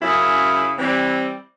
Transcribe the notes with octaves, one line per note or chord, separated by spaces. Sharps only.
F#2 C#3 E4
E3 G3 C4